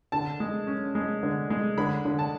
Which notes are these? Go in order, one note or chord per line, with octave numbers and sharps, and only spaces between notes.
D3 A5
G#3
C#4
G#3
D3
G#3
D3 B5
D3
A5